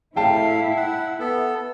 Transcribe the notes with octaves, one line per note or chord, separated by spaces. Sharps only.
A2 E4 F5 G5 A5
F#5
B3 A4